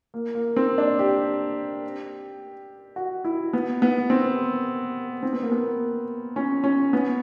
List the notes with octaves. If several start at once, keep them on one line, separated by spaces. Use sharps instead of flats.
A#3
A#3
C4
D4
G4
F#4
E4
B3
B3
C4
C4
B3
A#3
B3
C#4
C#4
B3